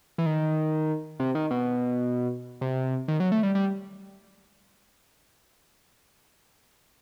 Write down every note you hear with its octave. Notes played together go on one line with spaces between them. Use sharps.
E3
D#3
C3
D#3
B2
C3
D#3
F#3
A3
G3
G3